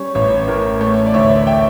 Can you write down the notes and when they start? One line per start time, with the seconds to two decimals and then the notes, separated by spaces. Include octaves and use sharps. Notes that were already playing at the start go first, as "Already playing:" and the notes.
Already playing: G3 C#4 C#5
0.15 A1 C#5
0.48 A2 A#4
0.81 A3 C#5
1.06 D5
1.14 D2 C#5 E5
1.47 E5 G5